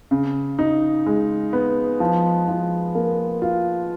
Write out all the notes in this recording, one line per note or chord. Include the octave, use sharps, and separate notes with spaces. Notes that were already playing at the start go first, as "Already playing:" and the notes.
C#3
D#4
G#3
B3
F3
F3
A#3
F4